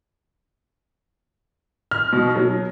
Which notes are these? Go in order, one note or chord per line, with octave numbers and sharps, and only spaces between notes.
F6
B2
F#3